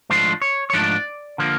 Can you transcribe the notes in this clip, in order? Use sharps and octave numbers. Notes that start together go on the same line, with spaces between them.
G#2 F3 A3 D4 C5
C#5
C#5
G#2 F3 A3 D4 D5
D3 F3 A#3